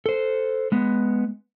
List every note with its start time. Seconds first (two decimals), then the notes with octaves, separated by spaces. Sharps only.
0.06 A4 C5
0.72 G#3 B3